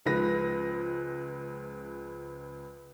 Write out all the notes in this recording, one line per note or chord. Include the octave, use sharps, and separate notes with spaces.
C#2 F3 G#3 B4 A#6